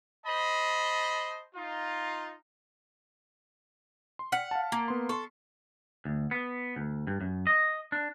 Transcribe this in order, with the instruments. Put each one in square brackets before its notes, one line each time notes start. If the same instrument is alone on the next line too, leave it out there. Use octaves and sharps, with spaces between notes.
[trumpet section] C5 D#5 A5 B5
D#4 F4
[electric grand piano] C6
[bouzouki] F#5 [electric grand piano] F6 B6 C#7
[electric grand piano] F5 A5
[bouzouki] A#3
[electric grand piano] B3 C6
[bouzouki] A4 [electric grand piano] C6 C#6
[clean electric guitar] D2
B3
D2
G2
F#2
D#5
D4